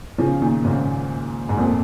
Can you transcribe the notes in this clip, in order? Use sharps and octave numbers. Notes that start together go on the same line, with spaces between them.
C#3 F3
A#2 D#3
G#2 C#3
G#2
F2 A#2